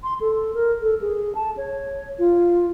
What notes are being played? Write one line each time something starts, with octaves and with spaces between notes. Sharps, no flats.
C6
A4
A#4
A4
G#4
A5
C#5
F4